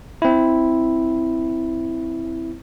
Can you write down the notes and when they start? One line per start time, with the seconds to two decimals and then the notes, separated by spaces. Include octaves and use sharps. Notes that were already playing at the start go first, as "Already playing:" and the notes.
0.22 C4 E4